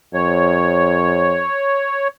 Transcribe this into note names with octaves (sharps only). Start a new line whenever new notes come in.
F2 C#5